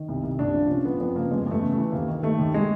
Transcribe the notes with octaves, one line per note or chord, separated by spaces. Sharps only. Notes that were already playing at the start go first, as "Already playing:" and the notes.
Already playing: D#3
C2
C2
A#2 D4
F3
F1 C#4
F3 B3
F2 B3
C#3 A#3
E2 G#3
E2 A3
C#3
E3 A3
D#2 A#3
D#3
D#3 A3
D#2
G#3